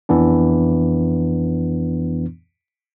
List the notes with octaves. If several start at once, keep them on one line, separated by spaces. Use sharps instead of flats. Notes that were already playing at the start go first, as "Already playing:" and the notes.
F2 E3 B3 D4